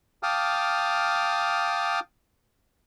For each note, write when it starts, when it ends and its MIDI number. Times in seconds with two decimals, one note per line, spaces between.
0.23 2.00 77
0.23 2.00 79
0.23 2.00 81
0.23 2.00 86
0.23 2.00 87
0.23 2.00 89